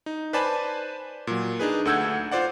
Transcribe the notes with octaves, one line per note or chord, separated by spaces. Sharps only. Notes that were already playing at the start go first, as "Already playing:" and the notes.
D#4
B4 C5 D5 G#5 A5 B5
A#2 F#3
D4 D#4 G#4 B4
D2 A4 F#5 E6 G6 G#6
F4 C5 D5 F#5